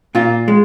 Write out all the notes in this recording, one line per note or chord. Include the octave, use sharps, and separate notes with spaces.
A#2 F4
G#3